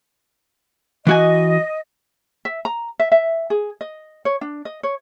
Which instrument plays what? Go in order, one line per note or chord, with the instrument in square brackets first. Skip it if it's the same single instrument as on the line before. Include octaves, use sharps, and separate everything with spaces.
[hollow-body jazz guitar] E3 F#4 G#5 [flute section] D#5
[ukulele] E5
A#5
E5
E5
G#4
D#5
C#5
D4
D#5
C#5